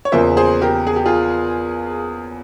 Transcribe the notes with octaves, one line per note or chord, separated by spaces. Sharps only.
C#5
E2 C#3 F3 A#3 C5 E5
G#4 C5
G4 A#4
G#4
G4
F4 G#4